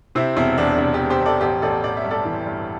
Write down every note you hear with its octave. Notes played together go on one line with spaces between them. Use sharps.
C3 C4 E4
E1 C4 E4
E2 D4
C3 D4
D4 G4
E2
G4 C5
E1
A4 D5
A1 G4 C5
A1 A4 D5
A1 D5
E5
G2
A4 D5
E3
G2